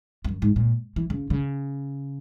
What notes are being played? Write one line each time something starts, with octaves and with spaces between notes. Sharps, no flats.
E2
F#2
G#2
A#2
E3
C#3
C#3